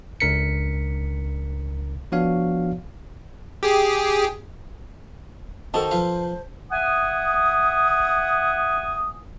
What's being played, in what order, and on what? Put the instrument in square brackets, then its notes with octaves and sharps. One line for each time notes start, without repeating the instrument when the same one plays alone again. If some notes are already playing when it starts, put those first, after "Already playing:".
[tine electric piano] C#2 D4 A#4 B6 C#7
F3 B3 D4 F#4 C#5 F5
[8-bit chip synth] G4 G#4
[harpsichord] D#3 D#4 F#4 [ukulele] A4 A5 [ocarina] C5
[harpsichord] F3 B4 F5
[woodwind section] E5 F#5 G#5 D#6